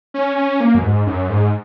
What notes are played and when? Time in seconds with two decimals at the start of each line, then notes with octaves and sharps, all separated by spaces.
0.14 C#4
0.37 C#4
0.60 A#3
0.75 F#2
0.83 G#2
1.07 F#2
1.30 G#2